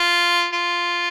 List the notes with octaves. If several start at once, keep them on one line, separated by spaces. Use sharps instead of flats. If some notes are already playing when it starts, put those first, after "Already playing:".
Already playing: F4
F4